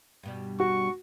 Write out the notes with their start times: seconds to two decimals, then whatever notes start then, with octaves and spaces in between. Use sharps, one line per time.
0.23 G2 B2 G3
0.60 F#4 C#6